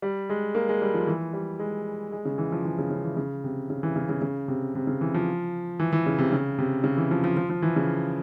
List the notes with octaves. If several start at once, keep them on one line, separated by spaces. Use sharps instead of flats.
G3
G#3
A#3
G#3
G3
F3
E3
G3
G#3
G#3
C#3
E3
F3
E3
C#3
C#3
E3
C#3
C3
C#3
E3
C#3
C#3
C#3
C3
C3
C#3
E3
F3
E3
E3
C#3
C3
C#3
C3
C#3
E3
F3
F3
F3
F3
E3
C#3